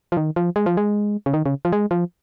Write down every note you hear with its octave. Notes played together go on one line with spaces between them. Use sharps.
F3
D#3
F3
G#3
F3
G#3
C#3
D#3
C#3
F3
G#3
F3